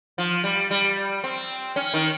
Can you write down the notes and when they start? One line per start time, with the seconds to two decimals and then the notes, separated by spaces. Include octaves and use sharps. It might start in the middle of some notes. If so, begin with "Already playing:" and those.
0.18 F3
0.44 G3
0.71 G3
1.24 C4
1.76 C#4
1.94 D#3